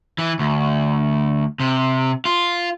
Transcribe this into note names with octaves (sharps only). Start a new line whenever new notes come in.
E3
D2
C3
F4